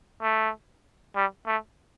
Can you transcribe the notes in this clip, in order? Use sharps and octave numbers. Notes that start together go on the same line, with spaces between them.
A3
G3
A3